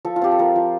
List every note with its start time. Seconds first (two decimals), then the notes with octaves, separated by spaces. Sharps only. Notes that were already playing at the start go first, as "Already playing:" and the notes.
0.05 F3 A4
0.16 F4
0.22 C4 G4
0.31 A4
0.39 F3 A#4
0.56 F3